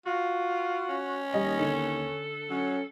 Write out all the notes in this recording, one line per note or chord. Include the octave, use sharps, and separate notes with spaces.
F4 F#4
C#4
D#2 G3 D#5
D3 A4
F#3 C#4